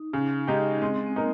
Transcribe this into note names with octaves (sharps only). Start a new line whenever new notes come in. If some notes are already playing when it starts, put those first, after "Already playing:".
Already playing: D#4
C#3
G#3 D#4 G4
G#3 C4
C4
A#3 D#4 A#4